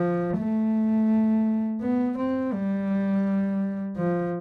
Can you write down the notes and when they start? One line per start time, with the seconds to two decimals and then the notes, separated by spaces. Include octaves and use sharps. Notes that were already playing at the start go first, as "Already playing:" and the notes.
Already playing: F3
0.37 A3
1.81 B3
2.17 C4
2.53 G3
3.97 F3